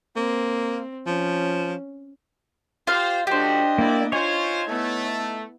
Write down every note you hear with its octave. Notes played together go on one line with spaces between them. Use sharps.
A#3 C4
F3 C#4
F4 G4 C5 F5
F3 A3 D4 F#4 G4 C5 D#5
A#3 E4 D5
D#4 F4 C5 C#5 G#5
A3 B3 E4